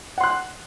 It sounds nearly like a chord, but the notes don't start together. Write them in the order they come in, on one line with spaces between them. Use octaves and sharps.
F#5 C6 F#6